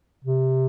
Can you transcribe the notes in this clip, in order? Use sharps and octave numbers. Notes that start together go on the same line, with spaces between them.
C3